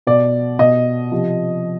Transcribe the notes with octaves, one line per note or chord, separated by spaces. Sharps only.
B2 D5
B2 D#5
C3 F3